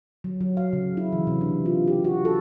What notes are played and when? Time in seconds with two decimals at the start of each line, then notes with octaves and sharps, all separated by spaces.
0.24 F#3
0.41 F#3
0.57 F5
0.73 C#3
0.97 E4
1.12 E3
1.27 C3
1.41 D4
1.66 F4
1.88 G4
2.04 F#4
2.25 A4